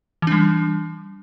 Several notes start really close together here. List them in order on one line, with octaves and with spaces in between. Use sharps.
E3 D4 G3